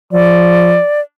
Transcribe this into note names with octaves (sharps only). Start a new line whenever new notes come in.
F3 D5